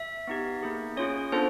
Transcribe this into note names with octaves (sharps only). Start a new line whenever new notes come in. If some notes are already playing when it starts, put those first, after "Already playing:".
Already playing: E5
B3 D#4 G4
A#3 D#4 G#4
C#4 F4 G#4 C#5
B3 D4 F4 A4 C5